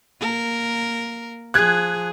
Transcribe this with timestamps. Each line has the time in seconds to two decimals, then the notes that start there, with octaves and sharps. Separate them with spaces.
0.21 A#3 A#4
1.54 F3 G#4 F#6 G#6